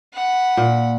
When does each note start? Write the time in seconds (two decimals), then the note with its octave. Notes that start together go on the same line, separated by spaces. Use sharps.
0.14 F#5 B5
0.57 A#2